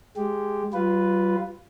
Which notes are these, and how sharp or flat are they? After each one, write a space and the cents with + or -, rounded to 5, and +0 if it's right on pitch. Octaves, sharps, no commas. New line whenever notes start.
G#3 +5 G4 +0
G3 -40 F4 +0 B4 +0